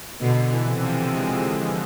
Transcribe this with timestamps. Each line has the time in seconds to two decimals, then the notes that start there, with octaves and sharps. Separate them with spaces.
0.20 B2 D3
0.51 E3
0.67 C3
0.82 F3
1.14 G#3